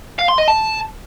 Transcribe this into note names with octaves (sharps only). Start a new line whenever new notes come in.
F5
C6
D#5
A5